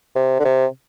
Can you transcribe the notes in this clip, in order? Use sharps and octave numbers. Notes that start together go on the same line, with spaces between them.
C3
D3
C3